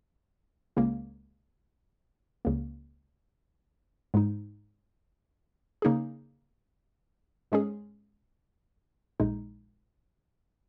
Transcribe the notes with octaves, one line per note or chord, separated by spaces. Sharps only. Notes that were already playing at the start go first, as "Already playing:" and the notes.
C#2 C#3 A#3
C#2 C#3 A#3
G#2 G#3 D#4
C#3 A#3 D#4 G#4
G#2 G#3 C#4 G#4
A#1 A#2 G#3 D#4